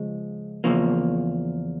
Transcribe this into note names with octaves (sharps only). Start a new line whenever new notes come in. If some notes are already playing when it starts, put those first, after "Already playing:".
Already playing: C#3 F3 G#3
E2 C#3 F3 A#3